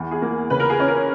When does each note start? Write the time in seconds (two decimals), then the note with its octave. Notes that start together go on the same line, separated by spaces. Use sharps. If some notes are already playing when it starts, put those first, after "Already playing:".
Already playing: E2
0.11 G#4
0.22 A#3
0.50 C#3 B4
0.60 A#4
0.70 G#4
0.80 C#4
0.88 A#4